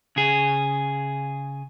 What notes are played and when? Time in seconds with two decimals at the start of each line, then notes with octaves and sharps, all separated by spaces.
0.16 C#3 G#4